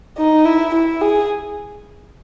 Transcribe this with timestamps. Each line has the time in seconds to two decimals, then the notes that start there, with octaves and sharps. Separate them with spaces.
0.17 D#4
0.45 E4
0.74 E4
1.01 G#4